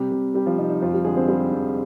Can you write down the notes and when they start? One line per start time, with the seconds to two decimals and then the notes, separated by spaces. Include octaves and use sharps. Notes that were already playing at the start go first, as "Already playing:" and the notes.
Already playing: C3 G3 G4
0.12 C3
0.34 G3 G4
0.46 F3 F4
0.58 C3 D#4
0.70 D#4
0.81 F2 F3 F4
0.94 G3 G4
1.05 D3 G#3 G#4
1.17 C4 C5
1.28 G3 G#3 G4
1.52 F2